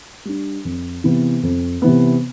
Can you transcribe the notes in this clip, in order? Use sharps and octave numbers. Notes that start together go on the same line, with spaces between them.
G3 D4
F2
C3 E3 B3
F2
C3 E3 B3